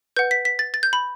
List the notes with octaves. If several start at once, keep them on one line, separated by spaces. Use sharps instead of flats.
B4 F#5 G6
B6
B6
A6
A6
G6
B5